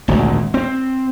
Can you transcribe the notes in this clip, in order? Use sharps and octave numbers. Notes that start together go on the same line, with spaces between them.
G#1 D2 A#2
C4